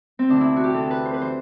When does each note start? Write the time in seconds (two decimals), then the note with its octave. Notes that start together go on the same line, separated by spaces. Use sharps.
0.19 C4
0.29 D2 C3 E3 D4
0.41 E4
0.56 F#4
0.64 G4
0.74 D2 C3 E3 A4
0.91 B4
1.06 C5
1.14 B4
1.22 E3 C5